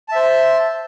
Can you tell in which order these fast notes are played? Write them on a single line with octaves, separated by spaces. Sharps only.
A5 E5 C5